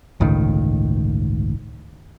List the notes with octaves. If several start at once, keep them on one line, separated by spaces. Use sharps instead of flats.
G1 C#2 A2 D#3